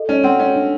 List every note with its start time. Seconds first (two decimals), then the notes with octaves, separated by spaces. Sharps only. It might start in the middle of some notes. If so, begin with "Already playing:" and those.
Already playing: A4 D#5
0.08 C#4 D5
0.24 C4 F#5
0.39 C#4 A4
0.55 D4